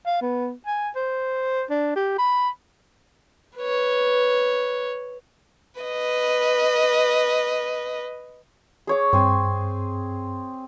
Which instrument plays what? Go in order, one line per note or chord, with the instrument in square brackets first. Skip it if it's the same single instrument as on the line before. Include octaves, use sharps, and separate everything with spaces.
[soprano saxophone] F5
B3
G#5
C5
D4
G4
B5
[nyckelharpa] B4 C#5
[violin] B4 D#5
[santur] G#4 C#5 D6
[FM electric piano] G2 [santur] C4 G#5